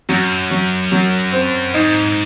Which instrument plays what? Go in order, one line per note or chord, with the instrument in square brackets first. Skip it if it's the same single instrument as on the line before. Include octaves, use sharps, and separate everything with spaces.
[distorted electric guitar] F#2 [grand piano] F#3
[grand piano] F#3
F#3
C4
[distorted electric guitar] G#2 [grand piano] D#4